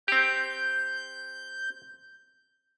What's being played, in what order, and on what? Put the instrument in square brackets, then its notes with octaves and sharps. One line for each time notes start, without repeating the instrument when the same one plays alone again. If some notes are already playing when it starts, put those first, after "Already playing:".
[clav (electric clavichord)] C4 G4 [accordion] G6